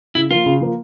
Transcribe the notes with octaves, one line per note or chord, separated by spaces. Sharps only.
C#3 E4
F3 A#3 F4
C#3
F3 A#3